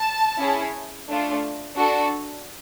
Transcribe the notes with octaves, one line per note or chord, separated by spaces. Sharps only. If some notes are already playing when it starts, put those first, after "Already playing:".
Already playing: A5
C#4 E4 G#4
A3 D4 F4
D4 F#4 A4